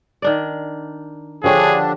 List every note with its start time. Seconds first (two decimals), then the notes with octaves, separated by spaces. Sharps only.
0.22 D#3 D4 D5
1.44 D3 F3 D4 G4 G#4 C#5